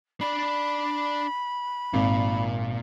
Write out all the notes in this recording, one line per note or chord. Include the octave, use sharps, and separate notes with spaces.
D4 D5 B5
G#1 A#2